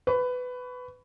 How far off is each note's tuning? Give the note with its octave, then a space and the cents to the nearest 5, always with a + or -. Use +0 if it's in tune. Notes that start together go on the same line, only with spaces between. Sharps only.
B4 +15 C#6 +25